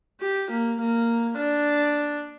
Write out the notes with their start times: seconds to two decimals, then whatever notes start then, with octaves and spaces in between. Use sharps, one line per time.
0.21 G4
0.50 A#3
0.80 A#3
1.37 D4